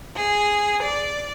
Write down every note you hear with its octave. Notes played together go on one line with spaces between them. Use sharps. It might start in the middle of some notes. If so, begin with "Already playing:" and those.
G#4
D5